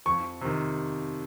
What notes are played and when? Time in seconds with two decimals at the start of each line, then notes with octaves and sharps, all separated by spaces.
0.06 F2 C#6
0.41 C3 D#3